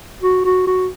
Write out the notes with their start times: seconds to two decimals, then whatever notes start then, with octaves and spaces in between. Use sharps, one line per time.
0.22 F#4
0.45 F#4
0.67 F#4